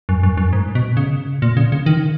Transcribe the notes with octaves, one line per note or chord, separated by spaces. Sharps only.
F#2
F#2
F#2
G#2
B2
C#3
A#2
C#3
C#3
D#3